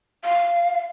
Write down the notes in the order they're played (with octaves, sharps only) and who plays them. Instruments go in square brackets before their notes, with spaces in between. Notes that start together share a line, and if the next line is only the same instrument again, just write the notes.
[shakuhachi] F5